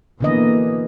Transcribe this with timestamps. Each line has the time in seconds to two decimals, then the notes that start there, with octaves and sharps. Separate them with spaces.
0.21 B2 D3 E3 A#3 D#5